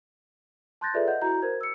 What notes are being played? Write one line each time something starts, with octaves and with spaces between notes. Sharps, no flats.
A5 C6 F#6 G6 A6 A#6
F4 G#4 A4 B4 D5 E5
D#5 F#5 G6
E4 F#4 A#5 G6
A#4 C5 G#6
E6 C#7